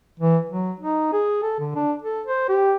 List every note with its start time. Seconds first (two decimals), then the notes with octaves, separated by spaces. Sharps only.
0.19 E3
0.49 F#3
0.80 D#4
1.13 G#4
1.43 A4
1.60 D3
1.75 D4
2.02 A4
2.26 C5
2.48 G4